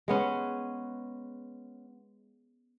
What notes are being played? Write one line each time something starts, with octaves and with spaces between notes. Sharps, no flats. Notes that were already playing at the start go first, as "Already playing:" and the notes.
G#3 B3 C#4